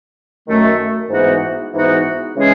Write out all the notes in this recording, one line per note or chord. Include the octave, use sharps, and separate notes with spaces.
F#2 D#3 A3
G#2 E3 B3 D#4 F#4
G#2 E3 B3 D#4 F#4
C#3 E3 G#3 C#4 G#4